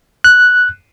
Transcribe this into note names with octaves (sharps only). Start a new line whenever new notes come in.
F#6